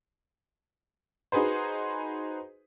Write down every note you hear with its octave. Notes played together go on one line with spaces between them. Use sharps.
D#4 F#4 G#4 B4 C5